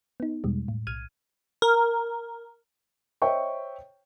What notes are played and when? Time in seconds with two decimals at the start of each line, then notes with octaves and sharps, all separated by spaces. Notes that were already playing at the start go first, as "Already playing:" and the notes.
0.20 B3 D#4
0.44 E2 B2 G3 G#3
0.68 A2
0.87 B1 F6 G#6 D#7
1.62 A#4
3.22 C5 C#5 D#5 E5 G5 C#6